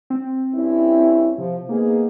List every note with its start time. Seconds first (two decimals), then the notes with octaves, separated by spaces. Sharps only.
0.10 C4
0.54 G2 C#4 E4
1.38 C3 F3
1.69 A#3 B3 D#4 G#4